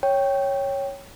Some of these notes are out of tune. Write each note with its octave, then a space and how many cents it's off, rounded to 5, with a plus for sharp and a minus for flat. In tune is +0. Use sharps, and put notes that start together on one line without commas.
C#5 -5 G5 +0